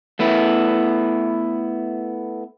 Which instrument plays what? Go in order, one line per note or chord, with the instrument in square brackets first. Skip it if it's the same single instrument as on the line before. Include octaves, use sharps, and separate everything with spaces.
[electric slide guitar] A3 B3 E4